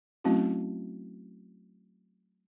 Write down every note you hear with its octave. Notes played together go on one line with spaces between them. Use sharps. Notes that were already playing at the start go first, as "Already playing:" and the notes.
F#3 A3 C4 C#4 E4 F#4